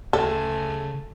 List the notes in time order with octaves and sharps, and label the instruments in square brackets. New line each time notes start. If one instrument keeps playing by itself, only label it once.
[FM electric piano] D2 G#4 E6 [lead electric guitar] C#3 G5 [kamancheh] A3 G#5 [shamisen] A4